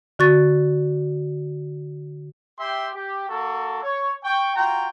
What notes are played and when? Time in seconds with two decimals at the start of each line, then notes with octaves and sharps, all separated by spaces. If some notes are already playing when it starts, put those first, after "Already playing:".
0.19 D3 F#4 C#6 A6
2.59 G4 E5 G5 C6
2.94 G4
3.29 A#3 F#4 A4
3.83 C#5
4.24 G5 C#6
4.56 F4 F#4 G5 A#5